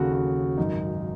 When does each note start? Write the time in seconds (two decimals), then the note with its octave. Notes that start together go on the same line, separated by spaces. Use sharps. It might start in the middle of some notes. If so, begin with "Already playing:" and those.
Already playing: D#2 C#3 F#3 F#4 A4
0.13 F#4
0.57 G#1 F#2 D#3 F#3 D#4